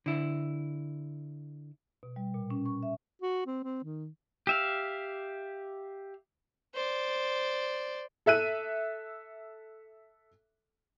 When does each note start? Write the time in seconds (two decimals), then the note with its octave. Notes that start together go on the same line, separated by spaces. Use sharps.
0.06 D3 E4
2.03 B2
2.16 G3
2.34 A#2
2.51 C#4
2.66 C#6
2.83 E5
3.22 F#4
3.46 C4
3.64 C4
3.84 D#3
4.47 G4 E5 F5
6.75 C5 D5
8.26 A4 E5 F#6 D#7